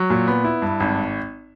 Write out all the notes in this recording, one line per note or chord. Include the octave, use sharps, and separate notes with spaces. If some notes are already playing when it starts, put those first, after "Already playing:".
Already playing: F#3
A#2
B3
E4
G2
G#1